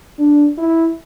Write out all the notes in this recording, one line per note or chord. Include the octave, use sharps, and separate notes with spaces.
D4
E4